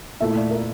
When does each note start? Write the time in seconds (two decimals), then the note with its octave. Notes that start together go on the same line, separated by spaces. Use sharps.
0.21 A#2 A3 E4 E5
0.36 D5
0.51 A#4